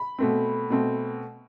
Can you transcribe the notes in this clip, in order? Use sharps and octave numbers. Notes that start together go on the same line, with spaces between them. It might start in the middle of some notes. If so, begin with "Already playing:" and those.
Already playing: B5
B2 A3 C4
B2 A3 C4